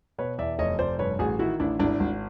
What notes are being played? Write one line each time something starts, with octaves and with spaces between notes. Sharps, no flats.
B2 B4 C#5
E2 D5 E5
F1 C#5 D#5
F1 C5 D5
G2 B4 C#5
A1 F#4 G#4
D#3 E4 F#4
A1 D4 E4
G#1 D4 E4
G#1